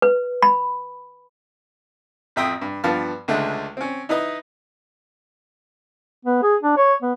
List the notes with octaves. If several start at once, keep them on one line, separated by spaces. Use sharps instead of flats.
B4
B5
A1 F2 E5 G5 C6 D#6
G2
G2 F3 B3 F5 A5 F6
C#2 D3 G#3 A3
C4 C#4
D#4 E4 B4 D#5
B3
G#4
D4
C#5
B3